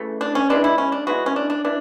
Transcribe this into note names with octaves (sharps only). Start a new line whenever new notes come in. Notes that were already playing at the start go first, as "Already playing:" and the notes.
Already playing: C#3 E3 A3
D4
C#4
E3 G#3 B3 D4
E4
C#4
D4
E3 G#3 B3 F#4
C#4
D4
D4
E3 D4